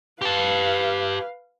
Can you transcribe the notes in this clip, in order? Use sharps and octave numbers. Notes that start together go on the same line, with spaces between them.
G4 B4 F5 A5